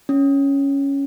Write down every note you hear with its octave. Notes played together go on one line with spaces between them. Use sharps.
C#4